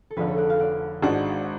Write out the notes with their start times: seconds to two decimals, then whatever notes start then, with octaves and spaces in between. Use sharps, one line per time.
0.11 A4
0.16 F1 F2 D3 G#4 B4
0.27 A4 C#5
0.38 D5 F#5
0.49 F5 G#5
0.59 D5 F#5
1.02 G#1 G#2 G#3 D4 F#4